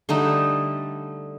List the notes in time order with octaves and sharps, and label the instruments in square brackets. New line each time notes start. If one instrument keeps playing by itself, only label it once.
[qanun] D3 G3 A3 D#4